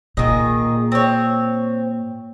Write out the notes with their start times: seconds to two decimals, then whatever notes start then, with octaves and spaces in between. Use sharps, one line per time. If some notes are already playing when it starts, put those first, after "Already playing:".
0.17 A#2 D#3 G#4 D#5
0.92 C4 C#5